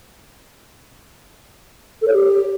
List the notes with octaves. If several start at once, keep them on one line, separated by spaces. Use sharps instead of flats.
A4
C#5
G4